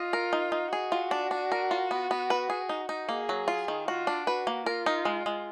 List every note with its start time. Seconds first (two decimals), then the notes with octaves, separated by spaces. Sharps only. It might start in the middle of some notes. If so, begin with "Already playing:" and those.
Already playing: F4 D#5
0.13 A#4
0.33 D#4
0.52 D#4
0.72 F#4 G#4
0.92 F4
1.11 D4
1.31 D4
1.52 A#4
1.71 F4
1.91 B3
2.11 B3
2.30 B4
2.50 G#4
2.69 D#4
2.89 D#4
3.08 A#3 G#4
3.29 F#3
3.48 F4
3.68 D#3
3.88 F4 F#4
4.07 D4
4.27 F#4 B4
4.47 A#3
4.66 F4 A#4
4.86 D#4
5.05 G#3
5.26 G#3